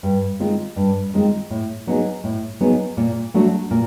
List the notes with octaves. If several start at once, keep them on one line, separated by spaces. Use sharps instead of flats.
G2
D#3 G#3 C4 F4
G2
D#3 G#3 C4 F4
A2
F#3 B3 D#4 G#4
A2
F#3 B3 D#4 G#4
A#2
F#3 A3 D4 F#4
A#2